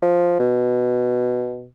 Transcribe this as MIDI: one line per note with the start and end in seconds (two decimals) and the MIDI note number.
0.02 0.35 53
0.39 1.67 47